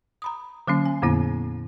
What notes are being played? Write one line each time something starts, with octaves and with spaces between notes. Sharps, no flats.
A#5 B5 D#6
D3 F#3 A#3 C#4
G#5
F2 A#2 D3 A#3 B3 E4